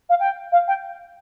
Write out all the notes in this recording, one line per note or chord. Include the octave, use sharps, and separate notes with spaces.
F5
G5
F5
G5